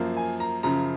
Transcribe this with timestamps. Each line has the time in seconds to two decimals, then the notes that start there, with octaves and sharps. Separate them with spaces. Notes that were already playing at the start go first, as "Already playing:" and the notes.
Already playing: F#2 F3 A#3
0.17 G#5
0.40 A#5
0.63 F#2 C#3 F3 A#5